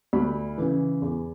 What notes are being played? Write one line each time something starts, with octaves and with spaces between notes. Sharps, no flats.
D2 B5
C#3 E3
E2